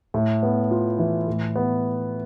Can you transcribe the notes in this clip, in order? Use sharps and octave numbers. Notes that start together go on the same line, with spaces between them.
A2
B3
F4
E3
A2
B3